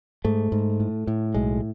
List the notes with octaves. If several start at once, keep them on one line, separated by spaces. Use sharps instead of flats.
G#2 A3
G#2
A2
A2
B1 G#3